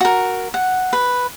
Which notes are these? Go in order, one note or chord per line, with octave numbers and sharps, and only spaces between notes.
F#4 A#4
F#5
B4